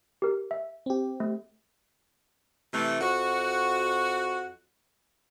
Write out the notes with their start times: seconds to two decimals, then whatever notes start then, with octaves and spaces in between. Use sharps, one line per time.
0.22 G4 A#4
0.51 E5
0.86 C4 G4
1.20 A3
2.72 C3 E3 A3
3.01 F2 F#4